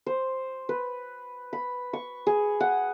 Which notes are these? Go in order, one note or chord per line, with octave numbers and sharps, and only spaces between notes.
C5
B4
B5
C#6
G#4
F#5